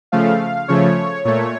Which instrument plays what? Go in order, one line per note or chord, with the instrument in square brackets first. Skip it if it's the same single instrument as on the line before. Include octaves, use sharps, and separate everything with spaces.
[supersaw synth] C#3 F3 A3 F5
C#3 F3 A3 C#5
A#2 A3 C#5